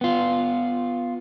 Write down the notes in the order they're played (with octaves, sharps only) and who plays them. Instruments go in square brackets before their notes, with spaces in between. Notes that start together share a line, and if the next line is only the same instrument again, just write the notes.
[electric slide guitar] B3 F4